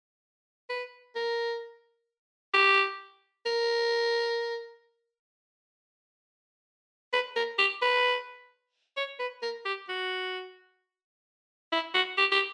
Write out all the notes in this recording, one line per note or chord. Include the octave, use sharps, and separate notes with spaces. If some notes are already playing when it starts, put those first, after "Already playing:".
B4
A#4
G4
A#4
B4
A#4
G4
B4
C#5
B4
A#4
G4
F#4
E4
F#4
G4
G4